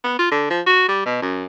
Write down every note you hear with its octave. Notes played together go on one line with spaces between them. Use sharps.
B3
F4
D3
F3
F#4
G3
B2
F#2